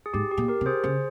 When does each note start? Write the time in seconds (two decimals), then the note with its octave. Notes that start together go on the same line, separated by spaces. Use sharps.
0.06 G#4
0.13 G#2 G4
0.31 G4
0.37 A#2
0.48 G4 A#4
0.61 C3
0.66 G#4 C5
0.83 C#3 G#4 C5